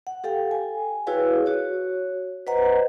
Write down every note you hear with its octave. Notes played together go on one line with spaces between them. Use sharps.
F#5
G4 A4 F5 G5
G5 G#5
E4 F#4 G#4 B4 C#5 F5
F#4 C#5
B4 C5 D#5 F#5 A#5